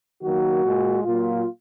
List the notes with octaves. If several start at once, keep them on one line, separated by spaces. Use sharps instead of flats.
D#3 F#3 A#3 F#4
A#2 G#3
A#2 F#3 A#3 F4